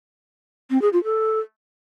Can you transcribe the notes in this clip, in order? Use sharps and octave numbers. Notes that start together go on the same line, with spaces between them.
C4
G#4
F4
A4